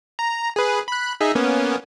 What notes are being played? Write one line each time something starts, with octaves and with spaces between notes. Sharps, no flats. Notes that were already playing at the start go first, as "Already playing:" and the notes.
A#5
G#4 B4
B5 F#6
D#4 G#4 E5
A#3 B3 C#4